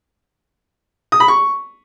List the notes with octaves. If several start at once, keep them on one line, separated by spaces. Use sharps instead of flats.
D#6
B5
C#6